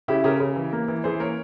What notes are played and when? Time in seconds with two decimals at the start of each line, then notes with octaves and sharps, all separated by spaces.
0.08 C#3 E4 G4
0.24 C#3 G4 A#4
0.40 C#3
0.56 E3
0.73 A#3
0.88 E3
1.04 E3 G#4 C5
1.20 A#3 A#4 C#5